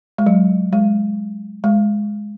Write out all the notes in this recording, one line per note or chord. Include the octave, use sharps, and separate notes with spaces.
G#3
F#3
G#3
G#3